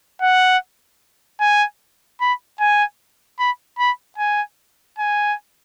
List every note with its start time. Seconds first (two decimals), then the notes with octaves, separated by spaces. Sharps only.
0.22 F#5
1.41 G#5
2.21 B5
2.60 G#5
3.39 B5
3.79 B5
4.18 G#5
4.98 G#5